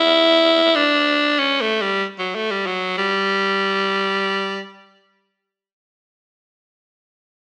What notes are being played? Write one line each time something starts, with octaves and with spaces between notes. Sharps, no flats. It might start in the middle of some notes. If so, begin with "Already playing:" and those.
Already playing: E4
D4
C#4
A3
G3
F#3
A3
G3
F#3
G3